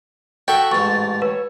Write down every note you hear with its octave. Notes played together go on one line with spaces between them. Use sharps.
F#4 A4 E5 G5
A1 G#2 C#6 A6
B4 C#5